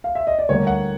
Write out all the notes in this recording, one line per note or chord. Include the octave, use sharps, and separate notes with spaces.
F5
E5
D#5
D5
D2 D3 G3 A#3 C#5
F#5